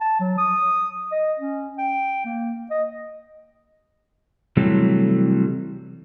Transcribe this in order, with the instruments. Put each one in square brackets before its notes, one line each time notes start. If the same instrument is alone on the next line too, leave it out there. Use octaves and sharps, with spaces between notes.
[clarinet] A5
F#3
D#6
D#5
C#4
G5
A#3
D#5
[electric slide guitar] C3 E3 F#3 G3 A3